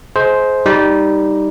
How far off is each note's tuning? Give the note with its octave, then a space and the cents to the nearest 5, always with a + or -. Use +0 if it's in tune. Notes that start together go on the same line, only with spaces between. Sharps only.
G#4 +35 C5 +0 D#5 +30
G3 +0 D#4 +0